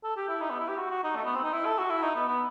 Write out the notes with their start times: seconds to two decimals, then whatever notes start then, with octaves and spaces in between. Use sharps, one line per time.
0.04 A4
0.17 G4
0.29 E4
0.41 D#4
0.50 B3
0.60 E4
0.69 G4
0.79 F#4
0.91 F#4
1.04 D#4
1.16 A3
1.25 B3
1.35 C4
1.44 D#4
1.53 E4
1.66 A4
1.79 F#4
1.90 E4
2.03 D#4
2.16 B3
2.28 B3